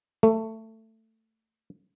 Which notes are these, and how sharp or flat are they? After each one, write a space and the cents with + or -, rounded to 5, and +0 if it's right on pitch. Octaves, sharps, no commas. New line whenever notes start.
A3 +15